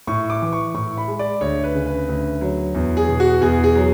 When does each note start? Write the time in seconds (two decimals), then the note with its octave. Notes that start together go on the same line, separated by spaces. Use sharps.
0.07 A2 C#6
0.30 D6
0.42 E3
0.53 C#6
0.74 A2 C#6
0.98 B5
1.08 G#3
1.19 D5
1.41 D2 C#5
1.64 B4
1.74 C#3
1.86 B4
2.09 D2
2.41 F#3
2.75 E2
2.97 G#4
3.08 B2
3.20 F#4
3.41 E2 G#4
3.64 G#4
3.75 F#3